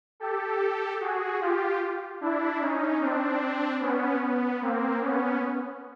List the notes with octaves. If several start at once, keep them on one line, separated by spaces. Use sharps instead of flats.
G4 A4
F#4 G#4
F4 G4
D4 E4
C#4 D#4
C4 D4
B3 C#4
B3
A#3 C4
B3 C#4